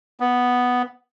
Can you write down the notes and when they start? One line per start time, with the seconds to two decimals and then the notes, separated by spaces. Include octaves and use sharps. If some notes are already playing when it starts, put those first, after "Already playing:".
0.20 B3